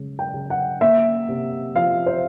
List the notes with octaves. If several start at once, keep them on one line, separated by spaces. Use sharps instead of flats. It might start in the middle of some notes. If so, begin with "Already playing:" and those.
Already playing: C#3 G#3
G5
C#3
F#5
A#3 E5
C3
F3 F5
C5